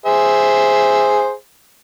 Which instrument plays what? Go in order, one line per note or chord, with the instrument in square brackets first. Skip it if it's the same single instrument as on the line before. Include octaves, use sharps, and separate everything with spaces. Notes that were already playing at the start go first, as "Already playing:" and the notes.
[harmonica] G#4 C5 E5